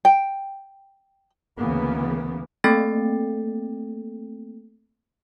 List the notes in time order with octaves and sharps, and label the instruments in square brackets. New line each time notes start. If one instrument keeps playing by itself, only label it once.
[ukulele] G5
[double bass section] D2 C#3 E3 A#3 B3
[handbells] A3 A#3 C4 A4 G5 A6